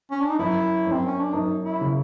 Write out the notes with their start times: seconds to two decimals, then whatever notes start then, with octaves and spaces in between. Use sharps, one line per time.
0.11 C#4
0.21 D4
0.30 D#4
0.39 F#2 E4
0.86 F#2
0.92 C4
1.06 C#4
1.19 D4
1.33 F#2 D#4
1.65 E4
1.81 C#3